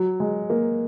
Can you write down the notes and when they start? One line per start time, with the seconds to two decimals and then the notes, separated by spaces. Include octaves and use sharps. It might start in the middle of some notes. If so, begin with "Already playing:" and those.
Already playing: F#3
0.20 G#3
0.50 A#3